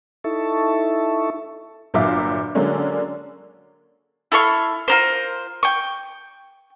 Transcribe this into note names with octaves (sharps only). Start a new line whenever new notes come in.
D#4 E4 A4 E5 A5 C#6
G1 A#2 F#3 E5 F5 D6
D3 F#3 G#3 A#3 C#4 D4
E4 A4 F5 C#6
F4 A#4 C5
G5 C#6